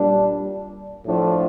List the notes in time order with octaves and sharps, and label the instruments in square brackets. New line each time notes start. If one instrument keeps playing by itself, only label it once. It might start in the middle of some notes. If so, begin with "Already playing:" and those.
Already playing: [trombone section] A#2 G3 D4
A2 F3 A3 D4 F4